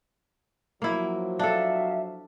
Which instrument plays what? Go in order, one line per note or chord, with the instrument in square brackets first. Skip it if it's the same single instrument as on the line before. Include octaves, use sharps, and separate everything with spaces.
[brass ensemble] F3 F#3 [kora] A#3 E4
[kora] D4 A4 [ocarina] E5 [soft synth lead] F5